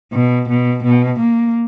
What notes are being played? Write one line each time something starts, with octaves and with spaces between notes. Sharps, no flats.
B2
B2
B2
A#3